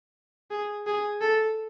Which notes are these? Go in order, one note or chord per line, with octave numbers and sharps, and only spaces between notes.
G#4
G#4
A4